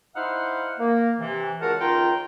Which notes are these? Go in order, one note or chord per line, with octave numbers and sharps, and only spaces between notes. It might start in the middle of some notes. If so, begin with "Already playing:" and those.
D#4 E4 C5 F5 F#5
A#3
C3 E3
C#2 G#3 F#4 A#4 F#5 A5
C#2 D#3 D#4 F4 G5 A#5